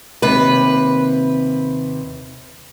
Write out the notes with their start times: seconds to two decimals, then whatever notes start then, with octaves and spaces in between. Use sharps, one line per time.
0.22 D#2 C3 B4